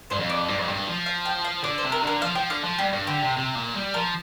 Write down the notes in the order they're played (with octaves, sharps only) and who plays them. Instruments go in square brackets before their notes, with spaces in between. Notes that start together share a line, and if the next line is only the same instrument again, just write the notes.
[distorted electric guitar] G2 [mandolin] C5
[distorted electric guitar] F2
[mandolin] D5
[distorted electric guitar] G2
F2
G2
F3
[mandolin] F5
G5
F5
[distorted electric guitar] D3 [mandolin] D5
[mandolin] C5
[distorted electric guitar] C3
[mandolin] A#4
[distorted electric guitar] D3 [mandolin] A#4
[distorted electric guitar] F3 [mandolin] F5
[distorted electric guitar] F3 [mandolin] G5
[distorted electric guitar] D3 [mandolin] F5
[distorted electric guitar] F3
[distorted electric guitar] G2 [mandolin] G4
[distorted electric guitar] G2
[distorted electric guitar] D3 [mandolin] G4
[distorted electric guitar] C3
C3
A#2
G3
[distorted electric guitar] F3 [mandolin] A#4